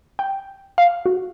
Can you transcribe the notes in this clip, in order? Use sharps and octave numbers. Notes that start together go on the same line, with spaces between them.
G5
F5
F#4